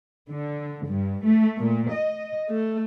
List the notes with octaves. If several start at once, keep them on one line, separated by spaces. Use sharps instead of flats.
D3
G2
A3
A#2
D#5
A3